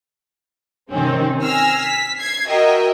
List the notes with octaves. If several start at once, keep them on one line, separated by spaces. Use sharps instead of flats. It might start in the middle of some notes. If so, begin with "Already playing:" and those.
C3 D#3 C4 C#4
G#5 E6 F6 A#6 C7
B6
G#6 C7
F#4 A#4 D#5 E5 G5